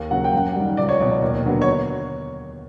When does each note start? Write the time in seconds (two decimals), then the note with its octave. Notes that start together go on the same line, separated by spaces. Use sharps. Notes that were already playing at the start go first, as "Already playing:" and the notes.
Already playing: D#2
0.11 C#3 F#3 F#5
0.24 G5
0.33 F#2 F#5
0.55 D#3 G3
0.77 C#2 D5
0.89 C#5
1.00 B2 F#3 D5
1.22 D#2
1.44 D3 F#3 B3
1.62 C#5